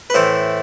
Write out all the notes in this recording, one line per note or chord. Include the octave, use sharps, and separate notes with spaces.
B4
A2 E3 C5